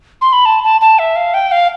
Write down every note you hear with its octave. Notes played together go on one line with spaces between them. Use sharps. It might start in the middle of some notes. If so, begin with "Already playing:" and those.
C6
B5
A5
A5
A5
E5
F5
G5
F5